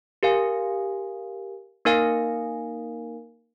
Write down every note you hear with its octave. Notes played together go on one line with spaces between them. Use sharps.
G4 A#4 F5 G#5
A#3 D#4 A#4 F5 G#5